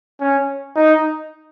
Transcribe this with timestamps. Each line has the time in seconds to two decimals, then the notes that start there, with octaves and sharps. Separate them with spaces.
0.20 C#4
0.76 D#4